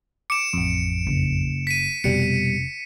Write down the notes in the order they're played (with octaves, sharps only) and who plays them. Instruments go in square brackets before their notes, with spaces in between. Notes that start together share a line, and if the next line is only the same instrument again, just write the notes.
[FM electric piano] D6 [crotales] C#7 D7 E7
[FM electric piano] A1 F2
[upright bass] F#1
[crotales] B6 D#7
[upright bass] F1 [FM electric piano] B2 G3 [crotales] C#7